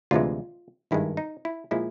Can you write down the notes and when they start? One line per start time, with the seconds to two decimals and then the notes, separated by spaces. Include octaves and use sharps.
0.11 D2 C3 E3 G#3 F4
0.91 G#1 G2 D#3 G#3 E4
1.17 D#4
1.45 E4
1.71 A#2 F3 G#3 E4